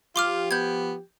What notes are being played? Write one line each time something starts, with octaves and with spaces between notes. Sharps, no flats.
F3 F4 G4 C6 D6 F6
B3 G6 G#6